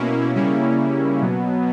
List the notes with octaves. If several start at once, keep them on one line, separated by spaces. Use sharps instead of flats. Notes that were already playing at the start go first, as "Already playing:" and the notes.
Already playing: B2 A#3 C#4 E4
C#3 G3 A#3 C#4 E4
B2 F#3 B3